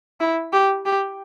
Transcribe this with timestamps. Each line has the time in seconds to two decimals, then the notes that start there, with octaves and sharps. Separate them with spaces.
0.20 E4
0.53 G4
0.85 G4